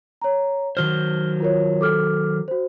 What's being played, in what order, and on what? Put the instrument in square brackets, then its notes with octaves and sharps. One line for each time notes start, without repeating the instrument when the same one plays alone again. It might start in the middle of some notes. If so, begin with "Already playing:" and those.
[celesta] C#5 A#5
[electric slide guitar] D#3 F#3 C5 [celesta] F6 G7
[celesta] F4 A#4 C#5
A4 D6 F6
F#4 C5